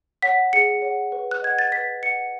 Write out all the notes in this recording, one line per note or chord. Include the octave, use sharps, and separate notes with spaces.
C#5 F#5 B6
G#4 C#7
C#5 F#5
B4
F#6
D#5 F#5 G#6
A6
B4 B6
D#5 F#5 C#7